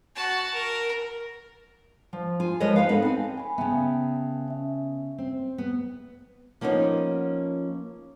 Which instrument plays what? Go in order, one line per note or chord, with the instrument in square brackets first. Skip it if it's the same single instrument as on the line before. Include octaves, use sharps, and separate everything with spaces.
[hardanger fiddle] F#4 A5
A#4
[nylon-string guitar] F3
F4 G#5
F3 G#3 A#4 B4 C#5 D#5
G#2 D#4 B4 F5
B3 D#4 A4 B4
C4 G#5
[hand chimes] G#5 B5
[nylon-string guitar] C#3 B3 [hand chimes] E5 G5 A5
[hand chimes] C#4 E5
[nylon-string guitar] C4
B3
F3 A#3 B3 C#4 D#4